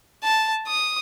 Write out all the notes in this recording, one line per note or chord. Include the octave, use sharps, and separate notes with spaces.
A5
D#6